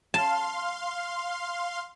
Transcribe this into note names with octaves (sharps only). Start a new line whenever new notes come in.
F5 A5 C6